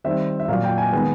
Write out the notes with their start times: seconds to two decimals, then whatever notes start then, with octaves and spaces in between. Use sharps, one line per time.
0.04 D#3 G3 C4 E5
0.40 E5
0.48 A#2 F#3 A#3 F5
0.64 G5
0.78 G#5
0.92 D#3 G#3 B3